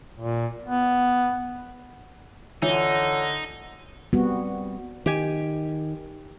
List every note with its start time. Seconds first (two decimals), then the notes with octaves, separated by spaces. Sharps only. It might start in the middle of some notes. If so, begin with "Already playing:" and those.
0.20 A#2
0.65 B3
2.62 D3 E3 D#4 F4 C#5
4.13 G3 B3 C4 F#4
5.06 D#3 G4 G#5